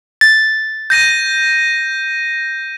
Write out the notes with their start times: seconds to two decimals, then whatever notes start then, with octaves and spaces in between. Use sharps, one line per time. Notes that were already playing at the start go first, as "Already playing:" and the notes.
0.21 A6
0.90 G6 A#6 D#7